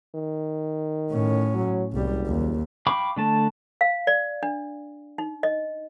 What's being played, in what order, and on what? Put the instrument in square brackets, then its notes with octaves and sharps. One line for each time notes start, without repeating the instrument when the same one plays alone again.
[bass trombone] D#3
[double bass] A2 C#4
[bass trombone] F#3
[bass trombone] F#1 [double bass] C2 G3
[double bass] D#2
[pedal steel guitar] F5 G5 B5 C#6 D6
D3 A3 A5
[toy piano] F5
D5
D4
D#4
D#5